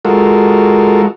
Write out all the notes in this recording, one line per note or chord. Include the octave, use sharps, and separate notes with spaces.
G#3 F4 F#4 A4 A#4